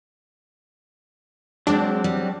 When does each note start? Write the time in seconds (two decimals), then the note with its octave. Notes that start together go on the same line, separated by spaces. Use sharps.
1.67 F#3 G#3 C4 D4
2.04 G3